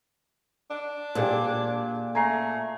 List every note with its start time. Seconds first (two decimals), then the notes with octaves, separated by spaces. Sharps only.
0.70 D4
1.15 A#2 G4 G#4 D5
2.15 A3 G#5 A#5 C7